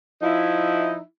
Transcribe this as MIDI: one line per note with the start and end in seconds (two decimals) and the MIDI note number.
0.22 0.99 53
0.22 0.99 63
0.22 0.99 64